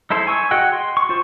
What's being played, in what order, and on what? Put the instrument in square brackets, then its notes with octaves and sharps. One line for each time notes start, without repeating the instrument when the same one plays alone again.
[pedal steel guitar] D#4 E4 A4 C5
G#5 C#6 E6
F#4 G#4 D#5 F#5 G5
C6
C#6
F4 C5 C#6